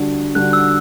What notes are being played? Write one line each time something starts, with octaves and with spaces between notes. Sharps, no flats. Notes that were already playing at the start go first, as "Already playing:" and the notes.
Already playing: D3 G3 D4 F#4
D3 G3 D4 F#4 F#6
E6